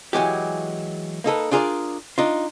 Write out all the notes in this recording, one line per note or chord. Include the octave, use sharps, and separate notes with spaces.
E3 F#3 G#3 G4
A#3 D#4 A4 B4
D4 F4 G#4 A#4 C5 D5
D4 D#4 F4